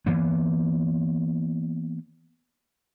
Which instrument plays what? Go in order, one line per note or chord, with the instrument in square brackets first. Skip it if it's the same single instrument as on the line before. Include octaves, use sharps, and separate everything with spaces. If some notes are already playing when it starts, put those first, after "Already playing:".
[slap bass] E3 A#3 B3